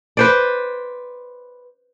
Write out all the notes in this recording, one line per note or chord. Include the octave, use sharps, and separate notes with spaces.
B4 C5 D5